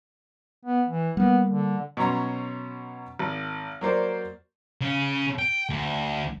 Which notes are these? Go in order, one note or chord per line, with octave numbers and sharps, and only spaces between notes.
B3
E3
G3 A#3 B3
D3
B2 F#3 C#4 A#5 C6
G#1
F#3 A#3 C5 D5
C#3 C#4
G5
D2